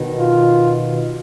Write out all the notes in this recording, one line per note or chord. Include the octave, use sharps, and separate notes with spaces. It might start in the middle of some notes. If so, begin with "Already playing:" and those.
Already playing: B2 D#3
F4